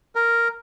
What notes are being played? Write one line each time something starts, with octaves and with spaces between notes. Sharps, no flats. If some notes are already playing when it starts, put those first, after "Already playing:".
A#4